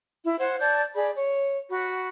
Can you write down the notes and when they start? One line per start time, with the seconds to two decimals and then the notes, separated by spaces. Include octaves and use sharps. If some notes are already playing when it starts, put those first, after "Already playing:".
0.24 E4
0.38 C5 F#5 G#6
0.60 D5 A5 G6 G#6
0.95 G#4 D5 B5
1.16 C#5
1.70 F#4 B5